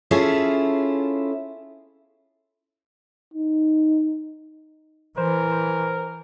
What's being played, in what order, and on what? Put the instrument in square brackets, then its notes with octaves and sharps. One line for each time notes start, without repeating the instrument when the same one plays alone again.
[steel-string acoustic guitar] C#4 E4 F4 G#4 A4
[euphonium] D#4
[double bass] E3 [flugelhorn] A#4 [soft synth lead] C5
[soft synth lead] C5